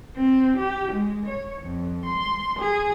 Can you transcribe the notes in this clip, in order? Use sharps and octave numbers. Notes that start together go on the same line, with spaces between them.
C4
G4
G#3
C#5
F2
C6
G#4